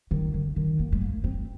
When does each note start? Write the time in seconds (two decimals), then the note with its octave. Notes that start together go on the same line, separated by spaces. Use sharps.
0.11 D#3
0.34 D3
0.56 D#3
0.79 A#3
0.92 G#3
1.01 A#3
1.24 C4